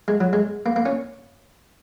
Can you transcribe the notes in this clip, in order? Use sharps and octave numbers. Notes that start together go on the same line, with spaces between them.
G#3
F#3
G#3
A#3
A#3
C#4